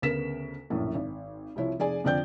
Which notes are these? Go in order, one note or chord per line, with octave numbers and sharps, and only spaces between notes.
D2 C#3 B3 A#4 B6 E7
A#1 F#2 A2
G#1
C2 F3 E4 C#5
F1 G#4 D5 G#5
F2 D3 F3 D5 G5 G6